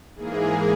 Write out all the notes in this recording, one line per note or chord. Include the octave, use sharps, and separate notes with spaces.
G#2 E3 A#3 G#4